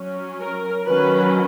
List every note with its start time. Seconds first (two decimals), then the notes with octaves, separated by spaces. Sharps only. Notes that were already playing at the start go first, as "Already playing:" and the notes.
Already playing: F#3 C#4
0.39 A#4
0.87 D#3 F#3 C#4 B4